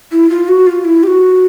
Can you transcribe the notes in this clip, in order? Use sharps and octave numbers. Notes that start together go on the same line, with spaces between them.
E4
F4
F#4
F4
E4
G4
F#4